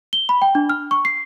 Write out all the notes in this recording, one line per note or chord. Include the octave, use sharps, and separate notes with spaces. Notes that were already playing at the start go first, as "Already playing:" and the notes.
G7
B5
G5
D4
F6
C#6
C7